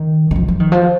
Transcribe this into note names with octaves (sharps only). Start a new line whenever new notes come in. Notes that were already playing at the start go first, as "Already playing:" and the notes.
Already playing: D#3
D#3
F3
F3
D#3
F3